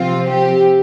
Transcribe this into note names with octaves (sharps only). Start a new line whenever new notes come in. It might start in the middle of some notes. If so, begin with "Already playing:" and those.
Already playing: C3 F3 C4 F4
G4